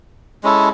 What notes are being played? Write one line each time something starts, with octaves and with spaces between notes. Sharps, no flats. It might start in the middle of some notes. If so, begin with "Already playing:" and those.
G#3 C#4 E4 A4